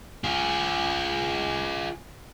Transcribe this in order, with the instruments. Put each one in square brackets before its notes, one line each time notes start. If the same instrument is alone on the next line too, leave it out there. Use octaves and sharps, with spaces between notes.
[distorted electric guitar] F4 G#4